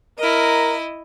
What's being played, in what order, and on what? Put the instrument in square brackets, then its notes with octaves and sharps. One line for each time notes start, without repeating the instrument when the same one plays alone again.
[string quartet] E4 D#5 [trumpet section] A#4